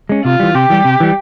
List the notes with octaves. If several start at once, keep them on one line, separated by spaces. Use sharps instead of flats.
G#3 C#4
C3 F4
E3 G3
C3 G4
E3 G3
C3
E3 G3